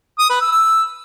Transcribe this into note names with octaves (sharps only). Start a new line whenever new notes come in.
D#6
B4
E6
E6